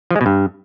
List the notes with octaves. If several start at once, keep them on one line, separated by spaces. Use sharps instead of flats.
F3
G#3
B2
G2